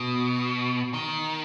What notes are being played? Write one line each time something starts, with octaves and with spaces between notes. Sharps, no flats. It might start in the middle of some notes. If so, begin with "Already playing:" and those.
Already playing: B2
D#3